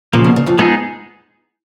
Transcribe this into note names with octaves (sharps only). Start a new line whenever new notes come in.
A#2 C#3 F3 A#3
B2
C#3
F2 F3
F2 F3 G#3 B3 D#4 G#4